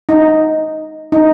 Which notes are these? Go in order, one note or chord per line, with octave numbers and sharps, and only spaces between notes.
D#4
D#4